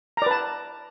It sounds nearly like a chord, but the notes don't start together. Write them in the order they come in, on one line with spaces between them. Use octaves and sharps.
A#5 D5 B4 A5